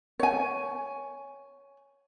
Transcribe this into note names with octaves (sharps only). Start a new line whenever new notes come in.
C#5 G#5